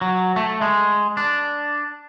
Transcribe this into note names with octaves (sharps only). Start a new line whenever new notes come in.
F#3
A3
G#3
D4